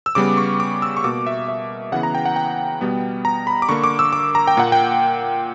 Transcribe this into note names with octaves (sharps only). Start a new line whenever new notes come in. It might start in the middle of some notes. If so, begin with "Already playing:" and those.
E6
C#3 G3 B3 D6
C#6
D6
E6
C#6
B2 A#3 D6
E5
E5
C#3 E3 B3 F#5
A#5
G5
F#5
G5
B2 G3 B3
A#5
B5
D6
D3 A#3 C#6
D6
E6
D6
A#5
G5
A#2 A#3 F#5
G5